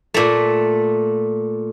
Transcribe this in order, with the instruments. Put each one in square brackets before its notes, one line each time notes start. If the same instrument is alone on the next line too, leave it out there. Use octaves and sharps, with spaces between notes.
[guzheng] A#2 A3